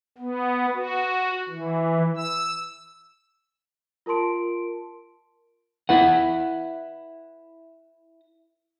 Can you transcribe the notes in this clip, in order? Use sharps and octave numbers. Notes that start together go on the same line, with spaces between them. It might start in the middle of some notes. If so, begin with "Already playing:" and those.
B3
F#4
E3
E6
F4 A#4 A5 C6 D7
E4 B4 F#5